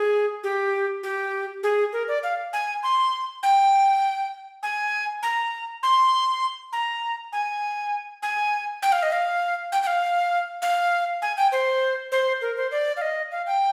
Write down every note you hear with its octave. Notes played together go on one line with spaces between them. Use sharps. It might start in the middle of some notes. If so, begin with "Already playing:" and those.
Already playing: G#4
G4
G4
G#4
A#4
D5
F5
G#5
C6
G5
G#5
A#5
C6
A#5
G#5
G#5
G5
F5
D#5
F5
G5
G5
F5
F5
G#5
G5
C5
C5
A#4
C5
D5
F5
D#5
F5
G5